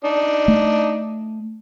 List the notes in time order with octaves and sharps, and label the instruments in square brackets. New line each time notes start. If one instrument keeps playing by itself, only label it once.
[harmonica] D4 D#4
[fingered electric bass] A3